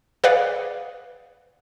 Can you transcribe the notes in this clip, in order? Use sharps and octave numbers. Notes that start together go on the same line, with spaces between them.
G#4 B4 D5 F5 F#5